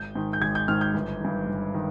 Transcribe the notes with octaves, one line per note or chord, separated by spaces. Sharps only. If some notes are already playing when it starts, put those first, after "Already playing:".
Already playing: G#1 G6
G#2 D#3
G6
G#1 G#6
G6
G#2 D#3 F6
G6
G1
G2 D#3
G1
D#3